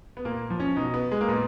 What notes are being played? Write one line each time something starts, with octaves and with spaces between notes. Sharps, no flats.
B3
A#2 A#3
F3
C#4
B2 D#4
B3
G#3
A#3
A#2 B3